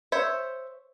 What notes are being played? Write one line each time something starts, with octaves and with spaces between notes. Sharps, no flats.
C5 C#5 E5